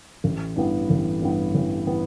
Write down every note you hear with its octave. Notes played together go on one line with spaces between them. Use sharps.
A1
G2 E3 B3
A1
G2 E3 B3
A1
E3 B3